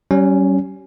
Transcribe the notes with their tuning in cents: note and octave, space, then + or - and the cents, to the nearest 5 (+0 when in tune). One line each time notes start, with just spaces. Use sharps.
G3 -35 C#4 +0